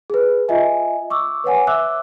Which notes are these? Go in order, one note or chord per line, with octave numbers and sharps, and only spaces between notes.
G#4 B4
F4 D#5 E5 G#5
C#6 D6 E6
B4 C#5 F#5 G#5
E5 D6 E6 F#6